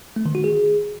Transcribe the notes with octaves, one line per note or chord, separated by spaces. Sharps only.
A3
D#3
F#4
G#4